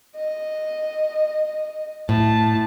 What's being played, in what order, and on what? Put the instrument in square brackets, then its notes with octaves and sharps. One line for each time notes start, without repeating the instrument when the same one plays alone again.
[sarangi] D#5
[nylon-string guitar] A2 [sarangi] A5